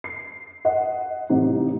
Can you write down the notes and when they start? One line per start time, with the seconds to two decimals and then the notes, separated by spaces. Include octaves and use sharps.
0.04 C7
0.65 D#5 F#5
1.30 A1 C3 D#4